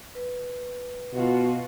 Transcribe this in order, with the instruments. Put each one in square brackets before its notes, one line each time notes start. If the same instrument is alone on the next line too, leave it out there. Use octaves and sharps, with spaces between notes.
[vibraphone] B4
[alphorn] B2 [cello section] F4 F#4